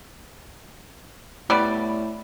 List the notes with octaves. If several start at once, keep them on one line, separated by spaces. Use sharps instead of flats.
A2 G3 B3 D5